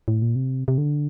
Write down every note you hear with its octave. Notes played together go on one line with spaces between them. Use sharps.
A2
A#2
C3
C3
D3